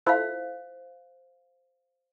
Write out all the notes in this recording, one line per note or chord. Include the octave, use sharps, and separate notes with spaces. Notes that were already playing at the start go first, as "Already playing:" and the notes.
E4 F4 A4 C5 F5